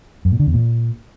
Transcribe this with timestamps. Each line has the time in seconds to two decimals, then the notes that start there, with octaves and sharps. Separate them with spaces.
0.25 F#2
0.32 A#2
0.39 D3
0.47 E2
0.54 A#2